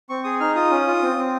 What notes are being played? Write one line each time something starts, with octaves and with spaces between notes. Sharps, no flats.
C4 C#6
G#4 D#6
D#4 F6
F4 D#6
C#4
F4
C4
C4